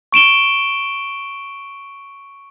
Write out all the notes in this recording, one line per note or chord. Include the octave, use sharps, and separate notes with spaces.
C#6 D7 E7 G7